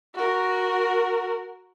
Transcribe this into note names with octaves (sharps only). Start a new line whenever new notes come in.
F#4 A#4